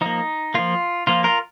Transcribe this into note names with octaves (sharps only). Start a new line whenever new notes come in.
F3 A#3 D#4
F3 A#3 F4
F3 A#3 F4
F4 A#4